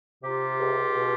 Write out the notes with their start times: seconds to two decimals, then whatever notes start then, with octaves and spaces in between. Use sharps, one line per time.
0.24 C3 F4 G4
0.59 C#2
0.95 B2